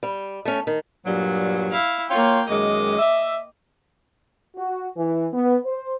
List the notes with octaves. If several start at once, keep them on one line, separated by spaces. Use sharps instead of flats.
G3
A3 C#4
D#3
G2 A#2 F#3
E4 F5
A#3 F4 C#5 G5
F#2 D#3 G#3 D#5 D6
E5
F#4
E3
B3
C5